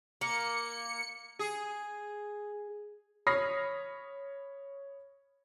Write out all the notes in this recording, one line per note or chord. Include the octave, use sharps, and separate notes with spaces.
A#3 C#7
G#4
C#5 B5 D#6 F6 A#6 C7